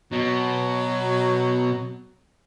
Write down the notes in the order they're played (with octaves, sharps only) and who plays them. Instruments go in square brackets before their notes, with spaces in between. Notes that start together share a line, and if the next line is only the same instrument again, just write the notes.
[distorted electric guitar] B2 [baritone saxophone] F#3